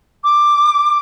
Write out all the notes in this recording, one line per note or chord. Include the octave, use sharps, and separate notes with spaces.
D6